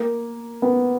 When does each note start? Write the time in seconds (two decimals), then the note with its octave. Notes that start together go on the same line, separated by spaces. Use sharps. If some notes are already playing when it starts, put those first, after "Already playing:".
Already playing: A#3
0.62 B3